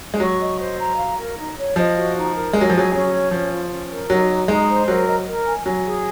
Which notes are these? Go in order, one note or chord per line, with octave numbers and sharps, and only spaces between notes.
G#3
F#3 C#6
D#5
C5
A#5
F5
A#4
D#4
C#5
F3 D#5
F#4
D#4
A#4
G#3 G#5
F#3
F3
F#3 G#4
F#3 C#4
C#5
F3 C#4
F4
C#4
A#4
F#3 D#4
F#4
G#3 D#4
C5
F#3 A#4
D#5
A#4
G#5
F#3 G#5
G#4